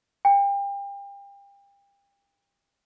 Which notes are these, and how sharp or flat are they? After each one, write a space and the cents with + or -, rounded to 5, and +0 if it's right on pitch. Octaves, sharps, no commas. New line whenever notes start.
G5 +35